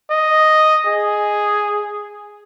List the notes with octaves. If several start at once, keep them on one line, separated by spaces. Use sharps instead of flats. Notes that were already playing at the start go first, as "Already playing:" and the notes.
D#5
G#4